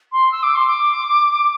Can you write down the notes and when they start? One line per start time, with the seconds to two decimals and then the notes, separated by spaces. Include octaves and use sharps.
0.12 C6
0.32 E6
0.43 D6
0.55 C6
0.67 D6